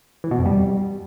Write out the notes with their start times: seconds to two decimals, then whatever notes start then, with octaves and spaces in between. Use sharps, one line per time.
0.24 E3
0.31 B2
0.38 F2
0.46 G3